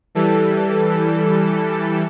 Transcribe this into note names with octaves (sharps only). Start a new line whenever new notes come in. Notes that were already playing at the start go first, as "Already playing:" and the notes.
E3 G3 A4